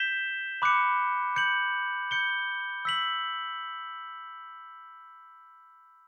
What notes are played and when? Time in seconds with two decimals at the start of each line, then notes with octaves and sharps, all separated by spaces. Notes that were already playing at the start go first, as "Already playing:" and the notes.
Already playing: G6 B6 E7 G7
0.62 B5 D6 F#6 C#7
1.36 G6 C#7 F#7
2.11 G6 C#7 G7
2.85 E6 B6 F#7